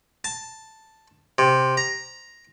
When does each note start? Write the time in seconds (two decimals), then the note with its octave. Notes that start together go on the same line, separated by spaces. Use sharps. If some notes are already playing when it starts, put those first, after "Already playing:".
0.24 A5
1.38 C3
1.77 A#5